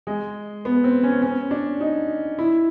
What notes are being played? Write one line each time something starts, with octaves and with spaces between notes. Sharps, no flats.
G#3
B3
C4
C#4
C#4
D4
D#4
E4